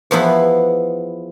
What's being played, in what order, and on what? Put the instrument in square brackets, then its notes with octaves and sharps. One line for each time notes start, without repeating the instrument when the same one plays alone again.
[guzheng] E2 F3 B3 E4 B4